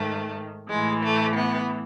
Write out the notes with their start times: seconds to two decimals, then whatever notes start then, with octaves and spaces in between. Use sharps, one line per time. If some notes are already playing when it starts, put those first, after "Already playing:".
Already playing: G#2 D#3 A3
0.70 A2 E3 G#3
1.03 A3
1.36 B3